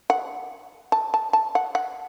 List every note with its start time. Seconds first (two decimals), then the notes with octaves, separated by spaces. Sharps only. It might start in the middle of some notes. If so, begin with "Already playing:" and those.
0.10 F#5
0.92 A5
1.14 A5
1.33 A5
1.55 F#5
1.75 F#5